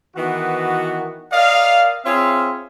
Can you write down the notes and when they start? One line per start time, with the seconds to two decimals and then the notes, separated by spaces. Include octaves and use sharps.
0.16 D#3 E3 B3 F#4
1.32 A#4 D5 D#5 F5
2.05 C4 F4 G#4 C#5 E5 F5